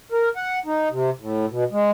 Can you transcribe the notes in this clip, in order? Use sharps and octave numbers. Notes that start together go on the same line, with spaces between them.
A#4
F#5
D#4
C3
A2
B2
G#3